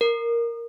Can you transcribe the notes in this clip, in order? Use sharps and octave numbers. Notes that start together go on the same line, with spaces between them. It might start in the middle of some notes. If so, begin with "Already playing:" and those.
A#4